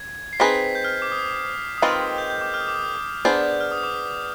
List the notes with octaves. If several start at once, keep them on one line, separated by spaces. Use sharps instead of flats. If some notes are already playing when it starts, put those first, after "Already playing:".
Already playing: G#6
C7
C4 D#4 G#4 B4 B6
G6
F6
D6
D#6
D#6
D#3 G#3 C4 F4 B4 F6
G6
G6
D6
F6
D#6
D6
D#6
B3 D4 G#4 C5 G6
F6
D#6
D6